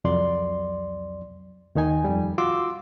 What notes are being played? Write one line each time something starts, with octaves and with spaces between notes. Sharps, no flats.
C2 F2 F#3 D5 C6
D#2 D#3 D#4 G#5
F2 G3
F4 F#4 C6 D6 E6